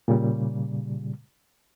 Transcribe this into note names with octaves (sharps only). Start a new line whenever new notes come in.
A#2 C#3 G3